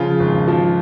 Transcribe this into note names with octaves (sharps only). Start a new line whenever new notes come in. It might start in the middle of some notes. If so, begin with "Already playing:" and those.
Already playing: C#3 F3 F4
G#1
F3